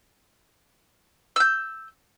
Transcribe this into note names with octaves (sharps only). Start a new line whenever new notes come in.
E6 G6